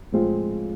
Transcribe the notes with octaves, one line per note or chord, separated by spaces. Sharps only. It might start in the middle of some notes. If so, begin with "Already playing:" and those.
A2 F3 G#3 C4 F4